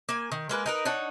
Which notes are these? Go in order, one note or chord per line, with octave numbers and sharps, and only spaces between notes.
A#3 G#5
D#3
G#3 A#3 B4
D#4 A#4 B4
D4 D#4 C#5 F#5